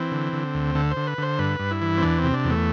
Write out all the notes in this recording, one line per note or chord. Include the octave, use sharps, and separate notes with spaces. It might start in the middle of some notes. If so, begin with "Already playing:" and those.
Already playing: E3 C4
D3
D3
D2
D3 A4
C5
D3
B4
D3 C5
G2 B4
G2
E4
E3
C4
E2 D4
C4
C3
D4
E2
A3